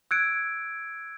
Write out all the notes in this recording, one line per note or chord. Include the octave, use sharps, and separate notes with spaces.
E6 F#6 G#6 C#7 D7